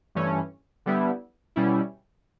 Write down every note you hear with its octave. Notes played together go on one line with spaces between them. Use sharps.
G2 E3 A3 C#4
D3 G3 B3 E4
B2 G3 C#4 E4